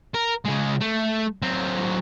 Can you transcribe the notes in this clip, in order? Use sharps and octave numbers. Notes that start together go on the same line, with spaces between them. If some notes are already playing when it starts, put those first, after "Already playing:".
A#4
C#3 G#3
A3
F#3 C4